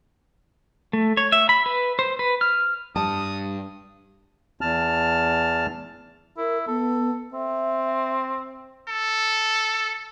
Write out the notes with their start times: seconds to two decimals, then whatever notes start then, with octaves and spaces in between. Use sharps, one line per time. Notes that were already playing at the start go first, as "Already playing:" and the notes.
0.93 A3
1.17 C#5
1.32 E5
1.49 B5
1.66 B4
1.99 C5
2.19 B4
2.41 F6
2.96 G2 A5 D#6
4.61 E2 A5 F6
6.37 E4 A#4
6.68 B3 A4
7.33 C4 E5
8.89 A4